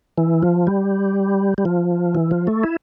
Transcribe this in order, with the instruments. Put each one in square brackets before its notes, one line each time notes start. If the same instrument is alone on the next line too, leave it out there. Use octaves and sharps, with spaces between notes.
[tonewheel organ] E3
F3
G3
G3
F3
E3
F3
A3
E4